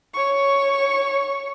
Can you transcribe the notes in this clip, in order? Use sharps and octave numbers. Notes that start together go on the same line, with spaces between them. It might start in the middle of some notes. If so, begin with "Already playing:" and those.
C#5 C#6